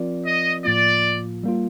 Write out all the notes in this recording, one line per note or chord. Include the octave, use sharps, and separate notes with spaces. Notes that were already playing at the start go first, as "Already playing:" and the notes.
Already playing: F3 C4 F4 A#4 D5
D#5
A2 F3 A#3 F4 D5
G3 A#3 F4